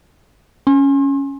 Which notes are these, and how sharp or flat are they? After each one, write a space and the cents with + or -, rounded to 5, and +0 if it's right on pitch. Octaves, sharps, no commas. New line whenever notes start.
C#4 +0 C6 +40